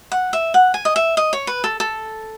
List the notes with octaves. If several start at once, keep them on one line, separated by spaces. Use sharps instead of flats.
F#5
E5
F#5
G#5
D#5
E5
D#5
C#5
B4
A4
A4